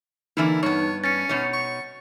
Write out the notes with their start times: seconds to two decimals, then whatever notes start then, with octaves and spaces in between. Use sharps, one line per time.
0.37 D3 E3 A#3 D#4 E4
0.63 G2 B3 C#5
1.04 C#4 A6 C#7
1.29 B2 D#4 C#5
1.53 C#6